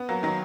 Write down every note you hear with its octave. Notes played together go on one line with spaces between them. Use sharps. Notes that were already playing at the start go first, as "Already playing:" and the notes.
Already playing: B3
F#3 A#3
D#3 F#3